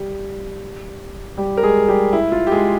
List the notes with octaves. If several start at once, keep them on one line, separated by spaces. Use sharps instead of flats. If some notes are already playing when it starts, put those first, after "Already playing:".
Already playing: G3 G4
G3 G4
A#4
G#3 G#4
G3 G4
E4
F4
G4
G#3 G#4